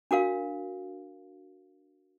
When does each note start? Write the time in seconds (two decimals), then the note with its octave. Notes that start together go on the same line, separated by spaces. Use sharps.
0.11 D4 F#4 A#4 F5